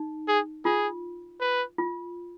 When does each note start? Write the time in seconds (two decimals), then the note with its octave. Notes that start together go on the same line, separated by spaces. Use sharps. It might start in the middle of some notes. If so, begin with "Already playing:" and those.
Already playing: D#4
0.28 G#4
0.65 F4 G#4
1.41 B4
1.78 F4